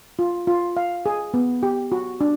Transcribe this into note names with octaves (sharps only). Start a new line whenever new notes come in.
F4
F4
F5
G#4
B3
G4
F#4
D4